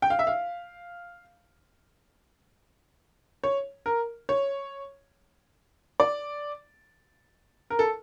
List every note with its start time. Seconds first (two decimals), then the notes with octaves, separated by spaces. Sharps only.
0.02 G5
0.10 F5
0.19 E5
0.27 F5
3.44 C#5
3.86 A#4
4.29 C#5
6.00 D5
7.70 A#4
7.79 A4